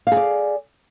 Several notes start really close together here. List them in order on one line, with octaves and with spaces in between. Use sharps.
F5 G#4 D5